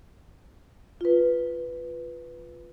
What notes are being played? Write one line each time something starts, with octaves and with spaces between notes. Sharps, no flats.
F4 B4